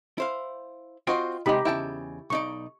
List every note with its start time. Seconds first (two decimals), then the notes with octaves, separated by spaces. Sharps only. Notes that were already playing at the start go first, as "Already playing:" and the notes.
0.18 E4 C5 F5
1.07 C4 F4 F#4 C5 D#5 G5
1.46 C3 F#3 G#3 D#4 G4 B5
1.65 E2 C#3 E4 G5 A5
2.30 B1 D#4 D5 C#6